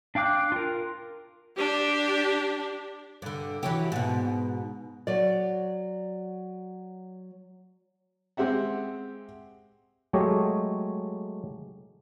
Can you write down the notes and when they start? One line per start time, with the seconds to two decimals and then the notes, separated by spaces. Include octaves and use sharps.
0.15 D4 F5 G5 D6 F#6
0.52 F4 A#4
1.57 D4 G4
3.22 G2 D3
3.63 E3 F#3 G4
3.92 G#2 B2
5.07 F#3 D5
8.37 G#3 C4 G4 E5 F#5
10.13 F#3 G#3 A3 G4 C#5 D#5